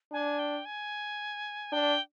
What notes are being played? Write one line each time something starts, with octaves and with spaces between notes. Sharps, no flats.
D4 G#5
G5
G#5
D4 G5